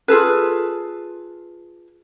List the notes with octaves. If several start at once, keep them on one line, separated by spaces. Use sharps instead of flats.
F4 G#4 A4 B4